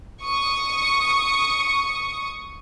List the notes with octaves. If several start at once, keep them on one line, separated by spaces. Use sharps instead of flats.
C#6 D#6